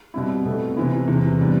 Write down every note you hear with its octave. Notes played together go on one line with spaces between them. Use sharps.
B2 G3 C4 E4
B2 A3 C4
C3 E3 B3 E4
E2 C3 E3
C3 G3 B3 D4